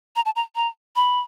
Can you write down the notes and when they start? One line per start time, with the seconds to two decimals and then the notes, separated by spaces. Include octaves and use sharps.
0.16 A#5
0.25 A5
0.36 A#5
0.56 A#5
0.96 B5